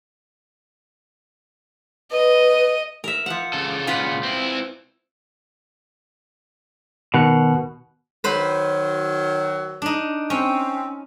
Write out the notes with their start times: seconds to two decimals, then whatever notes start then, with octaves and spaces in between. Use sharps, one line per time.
2.12 B4 D#5
3.04 A#4 E5
3.26 F3 F#5
3.53 C#3 A4
3.87 A#2 C#3 F4 B4 F#5
4.23 C4 E4
7.14 B2 D#3 F#5 F#6
8.24 D#3 F#3 B4 C5 B5
9.82 D4 D#4
10.30 C4 C#4